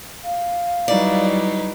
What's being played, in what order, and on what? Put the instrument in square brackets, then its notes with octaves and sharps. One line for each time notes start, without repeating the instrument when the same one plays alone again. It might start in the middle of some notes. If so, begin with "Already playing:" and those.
[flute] F5
[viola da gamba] F#3 G3 E4 [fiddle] D#4 B4 [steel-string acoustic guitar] D5